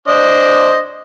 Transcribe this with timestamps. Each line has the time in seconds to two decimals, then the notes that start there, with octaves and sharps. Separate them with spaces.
0.08 D4 C5 D#5